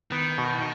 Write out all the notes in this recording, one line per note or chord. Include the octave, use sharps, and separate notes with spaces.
D#3 B3
B2